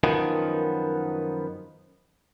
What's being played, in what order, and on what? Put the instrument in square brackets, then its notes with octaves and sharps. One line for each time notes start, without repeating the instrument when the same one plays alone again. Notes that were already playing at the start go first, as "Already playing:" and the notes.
[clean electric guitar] F#2 D#3 F3 B3